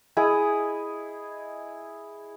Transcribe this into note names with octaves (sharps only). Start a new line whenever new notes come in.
E4 G#4 D#5